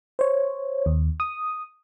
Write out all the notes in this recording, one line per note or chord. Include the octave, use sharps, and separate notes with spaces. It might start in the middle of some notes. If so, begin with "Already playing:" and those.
C5 C#5
D#2
D#6